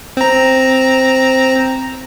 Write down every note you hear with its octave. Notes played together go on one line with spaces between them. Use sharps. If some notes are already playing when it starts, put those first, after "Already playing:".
C4 A#5